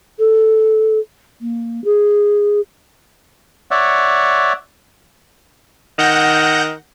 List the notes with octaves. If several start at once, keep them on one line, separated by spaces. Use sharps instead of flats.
A4
A#3
G#4
C#5 D5 E5 F#5
D#3 F#5 G6 A#6